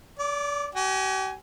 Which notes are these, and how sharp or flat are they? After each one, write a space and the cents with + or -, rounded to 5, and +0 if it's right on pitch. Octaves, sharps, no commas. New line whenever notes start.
D5 -35 D6 +0
G4 -45 G#5 +0